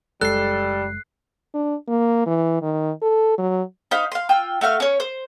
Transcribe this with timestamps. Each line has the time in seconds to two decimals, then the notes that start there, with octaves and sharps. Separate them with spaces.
0.21 F#1 G3 G#3 A4 F#6 C7
1.54 D4
1.88 A#3
2.26 E3
2.62 D#3
3.02 A4
3.38 F#3
3.91 D#4 C5 F5 B5
4.12 F5 C6
4.29 F4 G5 E6
4.61 A3 F#4 F5 F6
4.80 C#4 C#5
5.00 C5